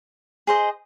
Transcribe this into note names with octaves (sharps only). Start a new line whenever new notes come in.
G#4 C5 D#5